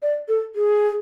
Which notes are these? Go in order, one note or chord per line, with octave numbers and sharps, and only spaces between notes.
D5
A4
G#4